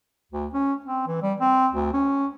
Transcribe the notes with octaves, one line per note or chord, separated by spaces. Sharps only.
D2
C#4
C4
E3
G3
C4
D2
C#4